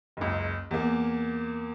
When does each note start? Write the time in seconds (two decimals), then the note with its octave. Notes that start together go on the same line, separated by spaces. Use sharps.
0.17 F#1 C#2
0.71 E2 A#3